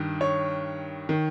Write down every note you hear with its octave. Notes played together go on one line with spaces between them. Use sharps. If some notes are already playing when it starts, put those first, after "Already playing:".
Already playing: G2 D#3
C#5
D#3